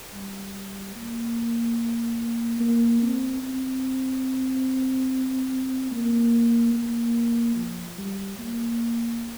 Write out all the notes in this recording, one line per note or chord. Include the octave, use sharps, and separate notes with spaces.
G3
A#3
A#3
C4
C4
A#3
A#3
F3
G3
A#3